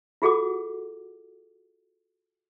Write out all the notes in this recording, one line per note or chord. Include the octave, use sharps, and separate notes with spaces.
F4 F#4 G#4 A4 F#5 D6